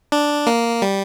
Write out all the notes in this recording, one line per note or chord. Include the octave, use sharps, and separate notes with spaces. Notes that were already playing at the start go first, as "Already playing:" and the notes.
D4
A#3
G3